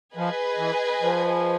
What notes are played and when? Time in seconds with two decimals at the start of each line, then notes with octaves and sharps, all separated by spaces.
0.15 F3 G#4 B4 D#5 G#5
0.59 E3
1.02 F3